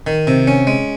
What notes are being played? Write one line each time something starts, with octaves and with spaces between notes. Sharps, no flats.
D#3
C3
C#4
G#3